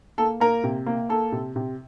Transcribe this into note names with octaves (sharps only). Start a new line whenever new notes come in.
A#3 A4
A#3 A#4
C3
A#3
A#3 A4
C3
C3